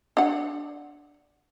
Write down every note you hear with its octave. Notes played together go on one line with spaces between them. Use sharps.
D4 F#5